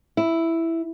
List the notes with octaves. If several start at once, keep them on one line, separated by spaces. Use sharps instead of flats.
E4